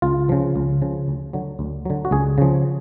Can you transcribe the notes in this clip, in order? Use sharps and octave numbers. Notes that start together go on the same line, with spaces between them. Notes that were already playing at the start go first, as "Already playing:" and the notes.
C#2 F4
C#3 F3
C#2
C#3 F3
D2
D3 F#3
D2
D3 F#3
F#4
C#2 G#4
C#3 F3